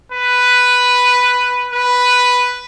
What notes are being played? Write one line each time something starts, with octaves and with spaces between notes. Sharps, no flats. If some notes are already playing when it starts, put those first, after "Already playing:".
B4
B4